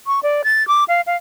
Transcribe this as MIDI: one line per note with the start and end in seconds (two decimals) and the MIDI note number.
0.07 0.20 85
0.23 0.42 74
0.44 0.66 93
0.68 0.84 86
0.88 1.01 77
1.07 1.16 77